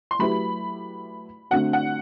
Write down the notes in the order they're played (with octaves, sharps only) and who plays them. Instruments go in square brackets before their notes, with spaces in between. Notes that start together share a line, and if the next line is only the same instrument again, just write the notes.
[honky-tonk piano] C6
[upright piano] F#3 A3 E4 G4 B4 [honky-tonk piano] B5
[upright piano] D3 A3 C4 F#4 [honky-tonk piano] F#5
[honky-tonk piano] F#5